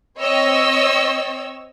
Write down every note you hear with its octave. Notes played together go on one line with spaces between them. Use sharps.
C4 C#5 D#5 E6